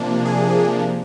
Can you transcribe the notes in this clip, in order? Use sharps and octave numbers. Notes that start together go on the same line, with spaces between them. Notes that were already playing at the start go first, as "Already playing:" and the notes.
Already playing: C3 F3 A#3 D4
G#4